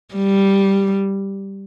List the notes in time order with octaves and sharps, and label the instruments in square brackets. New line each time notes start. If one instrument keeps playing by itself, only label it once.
[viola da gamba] G3